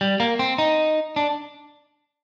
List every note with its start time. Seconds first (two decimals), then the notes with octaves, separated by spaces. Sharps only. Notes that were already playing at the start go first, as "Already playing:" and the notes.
0.01 G3
0.20 A#3
0.39 C4
0.58 D#4
1.16 D4